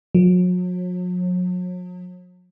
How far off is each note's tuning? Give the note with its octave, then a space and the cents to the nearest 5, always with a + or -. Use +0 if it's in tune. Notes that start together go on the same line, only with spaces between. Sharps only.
F#3 -40